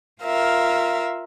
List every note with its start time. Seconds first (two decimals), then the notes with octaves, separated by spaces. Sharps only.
0.22 F4 A#4 E5 F5